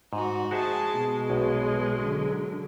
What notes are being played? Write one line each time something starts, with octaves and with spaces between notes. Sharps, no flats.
G#2 D#4 F#4
G#3 F#4 G#4 C5 E5 A5
B2
B1
D3 F#3